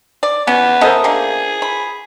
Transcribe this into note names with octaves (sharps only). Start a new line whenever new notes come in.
D5
B3 C#4
C#4 A4 A#4 C5 D#5 E5
D3 A#3 G#4
B5